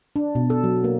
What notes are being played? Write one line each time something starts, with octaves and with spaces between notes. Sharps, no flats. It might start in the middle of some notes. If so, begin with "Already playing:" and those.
D4
B2
A4
F#3
A#3